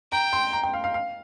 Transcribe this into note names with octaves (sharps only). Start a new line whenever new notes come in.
G5 A#5
C6
A#5
G5
F5
F5
F5